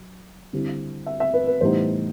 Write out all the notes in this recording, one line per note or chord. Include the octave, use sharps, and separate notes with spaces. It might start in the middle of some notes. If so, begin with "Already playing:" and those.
Already playing: F#3
D3 G3 C4 E4
E5
E5
B4
B4
A2 E3 G3 B3 D#4 C5